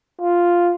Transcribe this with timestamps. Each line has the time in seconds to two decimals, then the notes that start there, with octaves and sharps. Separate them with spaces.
0.21 F4